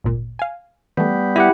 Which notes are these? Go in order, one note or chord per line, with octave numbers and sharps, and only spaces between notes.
G#1 D2 A#2
F5 G#5
E3 G3 A3 B3
E4 G4 F#5 B6